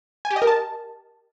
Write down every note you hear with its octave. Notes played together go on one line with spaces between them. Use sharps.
G#5
G4
D#5
A#4
A5